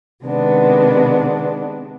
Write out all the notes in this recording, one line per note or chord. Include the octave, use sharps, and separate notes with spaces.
C3 D#3 G#3 B3 D4